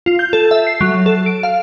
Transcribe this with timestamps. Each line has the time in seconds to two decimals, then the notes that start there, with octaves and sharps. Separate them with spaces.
0.06 F4
0.19 G6
0.33 A4
0.51 E5
0.67 C7
0.81 F#3
1.06 A4
1.26 D7
1.43 F5